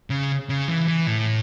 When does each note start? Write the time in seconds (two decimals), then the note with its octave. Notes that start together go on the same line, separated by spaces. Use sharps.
0.10 C#3
0.49 C#3
0.68 E3
0.88 E3
1.07 A2